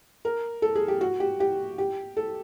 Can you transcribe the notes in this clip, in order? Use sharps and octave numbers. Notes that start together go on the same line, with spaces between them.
A#4
A4
G#4
G4
F#4
G4
G4
G4
A4